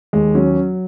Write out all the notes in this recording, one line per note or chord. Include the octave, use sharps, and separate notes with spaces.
D#2 G#3
F#3 C#4